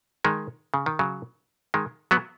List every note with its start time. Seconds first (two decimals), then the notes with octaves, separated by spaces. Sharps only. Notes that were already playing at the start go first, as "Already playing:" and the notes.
0.25 D#3 G#3
0.74 C#3
0.86 D#3
0.99 C#3 F#3
1.74 D#3 G#3
2.11 F#3 B3